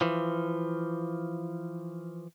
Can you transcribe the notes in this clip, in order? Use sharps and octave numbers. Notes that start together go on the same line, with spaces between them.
E3 F3